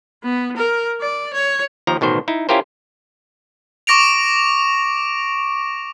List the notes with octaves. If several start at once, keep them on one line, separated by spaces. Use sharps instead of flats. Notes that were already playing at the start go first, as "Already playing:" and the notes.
B3
A#4
D5
C#5
D#2 F3 A#5
A1 B2 D#3 C5
D#4 E4
C#4 E4 F4 G4 A#4 C5
C#6 D6 A#6 D7 F7